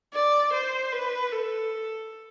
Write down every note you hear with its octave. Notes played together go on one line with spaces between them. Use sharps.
D5
C5
B4
A4